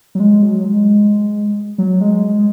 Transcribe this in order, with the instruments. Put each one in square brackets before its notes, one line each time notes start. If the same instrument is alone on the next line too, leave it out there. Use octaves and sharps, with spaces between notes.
[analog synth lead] F#3
G#3
F#3
G#3
F#3
G#3